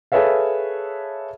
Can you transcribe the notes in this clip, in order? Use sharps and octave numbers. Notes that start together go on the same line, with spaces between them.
G#4 A4 B4 C#5 E5 F5